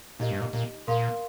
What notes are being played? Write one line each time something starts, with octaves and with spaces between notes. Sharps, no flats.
A#2 D#4 G4 D#5
G2
A#2
A#2
A#2 A#4 F5 C6